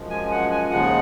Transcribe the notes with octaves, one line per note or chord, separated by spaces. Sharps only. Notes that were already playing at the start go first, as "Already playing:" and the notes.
Already playing: F#2 F3 G#3
G#5
F#5
G#5
D#2 C#3 F3 G#3 F#5